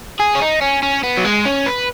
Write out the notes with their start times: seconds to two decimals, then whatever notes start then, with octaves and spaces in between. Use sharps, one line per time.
0.20 G#4
0.35 C#4
0.42 D#4
0.61 C#4
0.83 C#4
1.03 B3
1.17 F#3
1.25 G#3
1.45 C#4
1.66 B4